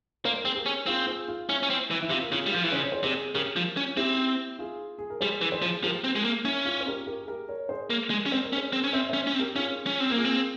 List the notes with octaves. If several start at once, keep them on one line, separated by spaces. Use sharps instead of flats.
A#3 C5
A#4
C4 G#4
G4 A#4
C#4
C4 F4 G#4
F4 G#4
F4
C#4 E4
C#4
C4
E3
E4
C3 F4
A#4
C#3 F4 G#4
G3
F3 F4 G#4
E3
C#3 C5
C#5
G#4 C5
C3 G#4 C5
C#3 G4 A#4
F3
C#4
C4 E4 G4
F4 G#4
G#4
A#4
G3 G#4 C5
E3
G#4 C5
F3
F3 G4 A#4
C4
G#3
A#3
C#4 E4
F4
C5
G4 A#4
G4 A#4
G#4
G4 A#4
A#4 C#5
G#4 C5
A#3
G#3
C#4
C4 C5
A#4
C#4
G#4 C5
C4
C#4
C4 C5 E5
C#4 C5 E5
C#4
C4
G4 A#4
C#4 F4 G#4
C#4
C4
A#3 A#4
F4 G#4
C4